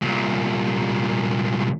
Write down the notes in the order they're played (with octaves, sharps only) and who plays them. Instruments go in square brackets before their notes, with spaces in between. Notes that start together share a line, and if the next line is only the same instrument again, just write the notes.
[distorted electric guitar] C2 A#2